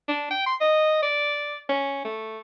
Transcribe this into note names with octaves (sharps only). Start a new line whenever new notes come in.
D4
G5
C6
D#5
D5
C#4
A3